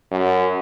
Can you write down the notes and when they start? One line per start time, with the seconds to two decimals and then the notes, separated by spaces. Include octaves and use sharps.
0.11 F#2